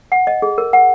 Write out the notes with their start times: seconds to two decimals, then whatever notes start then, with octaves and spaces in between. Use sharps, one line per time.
0.12 F#5
0.27 D#5
0.42 G#4
0.58 A#4
0.73 F#5